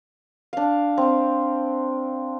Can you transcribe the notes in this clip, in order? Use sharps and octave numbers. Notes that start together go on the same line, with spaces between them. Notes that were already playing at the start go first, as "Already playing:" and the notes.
D4 F5
C4